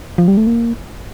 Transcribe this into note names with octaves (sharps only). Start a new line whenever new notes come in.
F3
G3
A3
A#3